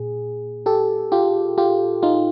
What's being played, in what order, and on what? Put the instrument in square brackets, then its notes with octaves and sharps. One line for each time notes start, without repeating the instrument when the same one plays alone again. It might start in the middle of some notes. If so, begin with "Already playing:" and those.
Already playing: [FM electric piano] A#2 G#4
G4 A4
F4 G4
F4 G4
D#4 F4